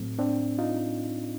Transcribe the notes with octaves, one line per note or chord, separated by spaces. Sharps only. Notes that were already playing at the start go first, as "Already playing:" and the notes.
Already playing: A2 F#3 A3 C4
C4 D4
D#4 F4